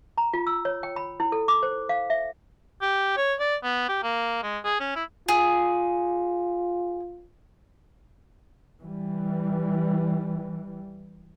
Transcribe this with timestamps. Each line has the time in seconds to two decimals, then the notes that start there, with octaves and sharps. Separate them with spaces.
0.18 A#5
0.34 F4
0.47 E6
0.65 C#5
0.83 G5
0.96 B5
1.20 E4
1.32 A4
1.48 D6
1.63 C5
1.89 F5
2.10 E5
2.82 G4
3.17 C#5
3.40 D5
3.64 B3
3.89 G4
4.03 A#3
4.43 G#3
4.64 G#4
4.80 C#4
4.96 E4
5.28 F4 G#4
8.81 E3 G3